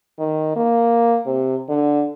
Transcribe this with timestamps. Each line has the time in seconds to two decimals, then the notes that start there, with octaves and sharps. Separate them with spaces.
0.19 D#3
0.56 A#3
1.26 C3
1.69 D3